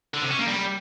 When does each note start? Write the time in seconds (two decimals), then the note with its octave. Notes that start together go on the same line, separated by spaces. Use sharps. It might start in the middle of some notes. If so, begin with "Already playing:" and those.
0.14 D3
0.22 C3
0.31 C#4
0.39 A#3
0.48 G3